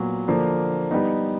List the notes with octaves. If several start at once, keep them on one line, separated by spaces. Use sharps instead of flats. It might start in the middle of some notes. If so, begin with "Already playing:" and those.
Already playing: A#2 F#3 B3
D3 F3 A#3 D4
G3 B3 D#4